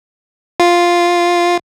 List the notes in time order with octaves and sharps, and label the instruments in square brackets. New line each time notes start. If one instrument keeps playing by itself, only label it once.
[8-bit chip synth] F4